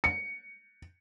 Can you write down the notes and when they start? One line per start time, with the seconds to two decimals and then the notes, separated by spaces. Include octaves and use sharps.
0.04 C#7